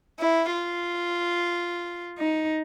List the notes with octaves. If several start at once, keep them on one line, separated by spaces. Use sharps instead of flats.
E4
F4
D#4